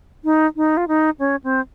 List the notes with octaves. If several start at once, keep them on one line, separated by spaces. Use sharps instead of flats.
D#4
D#4
F4
D#4
C#4
C4